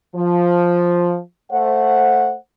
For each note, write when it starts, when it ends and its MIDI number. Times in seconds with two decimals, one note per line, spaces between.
0.16 1.18 53
1.51 2.35 57
1.51 2.35 72
1.51 2.35 78